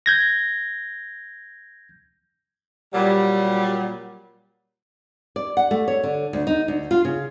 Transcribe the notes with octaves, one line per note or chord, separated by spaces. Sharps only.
G6 G#6 A#6
A#2 F#3 G3
D5
F#5
A3
C#5
D3
D2
D#4
D2
F4
C#3